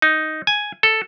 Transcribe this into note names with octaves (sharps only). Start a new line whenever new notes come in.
D#4
G#5
A4